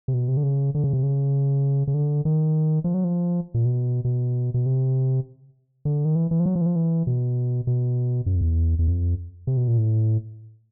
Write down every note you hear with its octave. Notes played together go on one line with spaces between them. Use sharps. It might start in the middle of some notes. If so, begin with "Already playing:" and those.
C3
B2
C3
D3
C#3
D3
C#3
C3
C#3
C#3
D3
D#3
F3
F#3
F3
A#2
B2
B2
B2
C3
D3
D#3
E3
E3
F3
F#3
F3
E3
F3
E3
B2
B2
F#2
F2
E2
E2
F2
C3
B2
A#2
A2